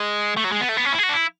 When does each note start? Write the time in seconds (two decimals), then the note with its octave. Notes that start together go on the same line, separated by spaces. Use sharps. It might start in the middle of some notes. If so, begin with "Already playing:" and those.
Already playing: G#3
0.37 A3
0.44 F#3
0.52 G#3
0.61 B3
0.69 A3
0.77 B3
0.85 C#4
0.93 E4
0.98 G#4
1.03 F#4
1.09 D4
1.14 E4